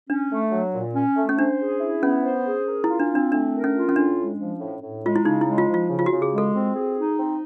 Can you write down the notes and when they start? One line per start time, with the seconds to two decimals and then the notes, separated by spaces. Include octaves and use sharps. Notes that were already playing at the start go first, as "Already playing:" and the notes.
0.10 C#4 D4
0.30 A3
0.52 F#3
0.73 A#2
0.95 C#4
1.17 A3
1.29 C#4
1.38 D4 C5
1.60 G#4
1.81 E4
2.03 B3 C#4
2.24 C5
2.45 G#4
2.67 A#4
2.84 E4
2.89 F4
3.00 D4
3.10 C4 D4
3.32 A3 D4
3.53 A#4
3.64 C#4
3.74 F4
3.89 C#4
3.96 A2 D4
4.18 G#3
4.39 F3
4.60 A2
4.82 A2
5.04 G#3 F4
5.16 E4
5.25 C#3 D#4
5.41 E4
5.46 G#3
5.58 F4
5.68 F3
5.74 F4
5.90 C#3
5.99 F4
6.06 F#4
6.12 C#3
6.22 G#4
6.32 G#3
6.38 A4
6.54 C4
6.76 G#4
6.97 D#4
7.18 C4